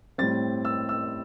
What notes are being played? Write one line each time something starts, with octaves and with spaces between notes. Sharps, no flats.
A2 G3 C4 A6
E6
E6